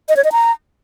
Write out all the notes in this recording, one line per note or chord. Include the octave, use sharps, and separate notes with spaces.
D#5
C#5
D#5
A#5